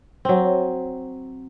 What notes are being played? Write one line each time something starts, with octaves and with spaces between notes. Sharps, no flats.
F#3 C4